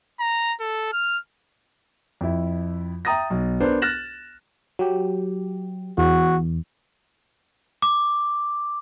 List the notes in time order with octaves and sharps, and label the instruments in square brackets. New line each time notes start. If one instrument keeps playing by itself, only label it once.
[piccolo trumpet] A#5
A4
F6
[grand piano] F2 E4
E5 G5 A#5 D#6 A6 A#6
B1
B3 D4 A#4 C5
F6 F#6 A6 A#6 E7 F#7
[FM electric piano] F#3 G4
[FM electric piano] E2 [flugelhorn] F#4
[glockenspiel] D6